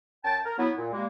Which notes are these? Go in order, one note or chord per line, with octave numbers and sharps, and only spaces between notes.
F#2 G5 A5
A#4
F#3 B3 E4
A#2
G3 G#3 A#3